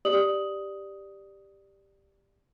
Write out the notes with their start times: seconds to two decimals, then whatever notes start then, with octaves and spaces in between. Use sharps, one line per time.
0.05 G4 D5 D#6 F#7